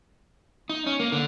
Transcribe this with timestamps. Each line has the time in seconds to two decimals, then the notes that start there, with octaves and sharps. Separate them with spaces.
0.70 D#4
0.86 C#4
1.00 A#3
1.12 D3